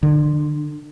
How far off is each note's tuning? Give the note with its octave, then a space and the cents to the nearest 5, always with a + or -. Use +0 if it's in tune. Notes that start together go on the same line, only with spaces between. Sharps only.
D3 +30